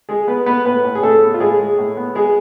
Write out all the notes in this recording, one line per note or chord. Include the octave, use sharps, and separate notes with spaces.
G#3 G#4
B3 B4
B3 B4
A2 B3 B4
A2
G#4
A2 A3 A4
B3
F4
A2 G#3 G#4
G#3
A2
B3
G#3 B3 G#4